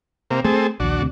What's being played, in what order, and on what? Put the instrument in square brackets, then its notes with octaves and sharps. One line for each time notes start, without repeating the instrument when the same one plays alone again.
[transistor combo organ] C3 A#3
[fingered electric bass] A3 [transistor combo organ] C4 G#4 A4
[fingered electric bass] A#1 D#2 [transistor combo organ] D4 F#4
[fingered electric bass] D2 C3